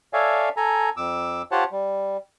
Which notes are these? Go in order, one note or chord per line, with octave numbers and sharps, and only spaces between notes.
A4 C#5 D5 E5 F5 G#5
A4 G#5 A#5
F2 D6 E6
F4 G4 C5 C#5 F#5 A5
G3